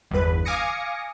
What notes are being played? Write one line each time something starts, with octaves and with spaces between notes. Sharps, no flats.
G1 E2 B4
F5 G#5 D6 D#6 A#6 C#7